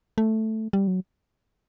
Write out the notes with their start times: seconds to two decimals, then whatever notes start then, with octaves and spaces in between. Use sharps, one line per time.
0.18 A3
0.73 G3
0.87 F#3